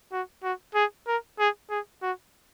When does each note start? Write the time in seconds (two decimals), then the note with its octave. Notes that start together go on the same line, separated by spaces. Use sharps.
0.12 F#4
0.43 F#4
0.75 G#4
1.07 A#4
1.39 G#4
1.70 G#4
2.02 F#4